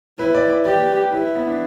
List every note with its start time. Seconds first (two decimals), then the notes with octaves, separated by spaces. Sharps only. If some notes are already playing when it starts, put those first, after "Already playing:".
0.19 E4 B4
0.35 D5
0.50 D5
0.65 G4 D5
1.12 E4 B4
1.35 B3
1.47 D4